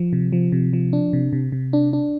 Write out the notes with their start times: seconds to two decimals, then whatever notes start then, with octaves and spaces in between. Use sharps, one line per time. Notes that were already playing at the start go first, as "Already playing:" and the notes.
Already playing: F3
0.13 C3
0.33 F3
0.52 C3
0.73 F3
0.93 D4
1.13 C3
1.33 C3
1.52 C3
1.73 D4
1.93 D4